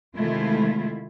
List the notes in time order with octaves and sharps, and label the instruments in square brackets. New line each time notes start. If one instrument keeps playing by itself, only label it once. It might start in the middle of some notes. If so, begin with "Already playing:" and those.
[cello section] C3 D#3 G#3 A3 E4 F4